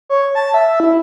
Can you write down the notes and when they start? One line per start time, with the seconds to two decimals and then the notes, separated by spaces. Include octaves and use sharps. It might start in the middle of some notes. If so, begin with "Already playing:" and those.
0.09 C#5
0.35 A5
0.54 E5
0.80 E4